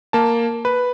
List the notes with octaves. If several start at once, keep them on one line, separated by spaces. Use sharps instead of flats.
A#3 A5
B4